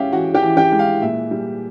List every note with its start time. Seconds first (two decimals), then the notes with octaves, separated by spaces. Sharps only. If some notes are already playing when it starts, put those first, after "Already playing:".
Already playing: G#3 C#4 G4 G#4 E5 F5 G5
0.12 E3 F#4 F#5
0.35 G4 G5
0.42 E3
0.57 G4 G5
0.72 G#3
0.79 F5
1.01 A#2 E5
1.31 G3